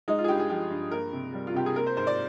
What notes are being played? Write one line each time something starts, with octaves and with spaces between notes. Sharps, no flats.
G#3 D#4
F4
G#4
G2 G4
G#4
F3 G4
G2
A#3 A#4
C3
G3
F4
C3 G4
G#4
A#3 A#4
C5
G#2 C5
D5